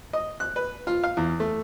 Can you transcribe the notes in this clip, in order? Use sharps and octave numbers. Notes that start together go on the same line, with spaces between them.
D#5
F#6
B4
F4
F5
E2
A3